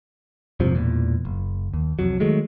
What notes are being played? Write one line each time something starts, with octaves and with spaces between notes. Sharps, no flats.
E1 G2 C3 F3
E1 E2 A#2
F#1
D#2
C2 F2 F#3
D#3 F#3 G#3 A3